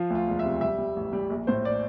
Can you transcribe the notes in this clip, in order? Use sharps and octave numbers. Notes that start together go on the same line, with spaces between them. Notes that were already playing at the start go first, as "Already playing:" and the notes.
Already playing: F3 F4
D2
F4
E1
C3 E5
G3 E5
G3
A1
G3
A#1
A2 C5
D5